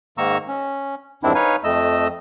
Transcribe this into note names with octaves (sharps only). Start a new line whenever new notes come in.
G#2 D#3 A#3 A#5 C#6 E6
C#4
E2 G2 D#3 C4 D4 E4
D#4 B4 C#5 F5 G#5
F2 A3 D#5 E6